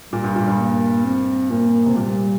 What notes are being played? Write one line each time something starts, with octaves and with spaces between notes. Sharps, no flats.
A#2 G3
G2
A#2
G2
A#3
C4
A#2 A#3
C3
A#2 G3